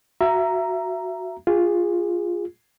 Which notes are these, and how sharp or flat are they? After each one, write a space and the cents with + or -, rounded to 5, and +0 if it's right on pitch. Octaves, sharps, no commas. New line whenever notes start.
F#4 +0 E5 +25 A#5 +0
F4 +0 G#4 -20